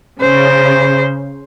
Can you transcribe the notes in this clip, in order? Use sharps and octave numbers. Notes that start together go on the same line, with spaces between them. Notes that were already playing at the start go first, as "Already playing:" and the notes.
C#3 C5